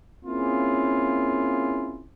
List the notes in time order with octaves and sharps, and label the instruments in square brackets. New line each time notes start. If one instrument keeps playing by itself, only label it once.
[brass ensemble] A#3 C4 C#4 E4 F4 G#4